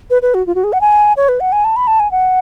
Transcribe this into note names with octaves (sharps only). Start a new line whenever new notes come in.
B4
B4
F#4
F4
F#4
G#4
F#5
G#5
C#5
B4
F#5
G#5
A5
B5
A5
G#5
F#5